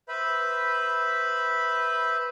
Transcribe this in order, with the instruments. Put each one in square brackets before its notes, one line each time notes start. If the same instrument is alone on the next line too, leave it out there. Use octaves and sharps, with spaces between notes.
[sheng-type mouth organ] B4 C5 E5 B5